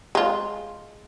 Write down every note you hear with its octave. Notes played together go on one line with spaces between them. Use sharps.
G#3 F4